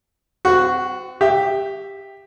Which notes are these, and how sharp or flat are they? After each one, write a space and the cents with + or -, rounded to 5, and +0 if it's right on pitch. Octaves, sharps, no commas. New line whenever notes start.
C4 -35 F#4 +0
G4 +10 E5 +0